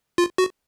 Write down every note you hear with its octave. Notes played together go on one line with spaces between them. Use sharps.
F4
F#4